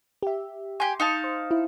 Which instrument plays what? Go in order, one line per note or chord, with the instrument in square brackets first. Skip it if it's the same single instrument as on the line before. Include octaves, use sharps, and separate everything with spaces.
[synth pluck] G4 E5
[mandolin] G4 G#5 [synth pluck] C6
[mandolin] D#4 F5 A5
[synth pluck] C5
E4